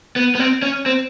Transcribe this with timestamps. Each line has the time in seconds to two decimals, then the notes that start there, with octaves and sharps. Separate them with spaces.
0.16 B3
0.35 B3
0.40 C4
0.62 C#4
0.86 C4